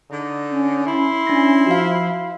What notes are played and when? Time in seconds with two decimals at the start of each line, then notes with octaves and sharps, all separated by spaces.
0.11 D3 D#4
0.51 C#4
0.87 E4 C6
1.27 C#4 D4 A#6
1.67 F3 F#4 F5